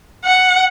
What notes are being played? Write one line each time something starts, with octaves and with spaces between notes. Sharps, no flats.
F#5